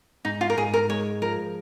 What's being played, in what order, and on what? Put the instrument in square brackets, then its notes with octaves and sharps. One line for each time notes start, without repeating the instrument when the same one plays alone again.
[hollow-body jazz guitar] G#2 [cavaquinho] D#4
[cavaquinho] F4
A#4
[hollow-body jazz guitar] G#2 [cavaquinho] G#4
[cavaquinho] A#4
[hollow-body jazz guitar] G#3 [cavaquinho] C#5
[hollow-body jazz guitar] F3 [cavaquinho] A#4